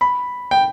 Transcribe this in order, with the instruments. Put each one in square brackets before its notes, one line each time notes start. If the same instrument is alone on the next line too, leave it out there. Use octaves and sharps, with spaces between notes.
[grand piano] B5
G5